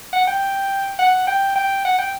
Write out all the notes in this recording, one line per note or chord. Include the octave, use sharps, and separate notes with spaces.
F#5
G5
F#5
G5
G5
F#5
G5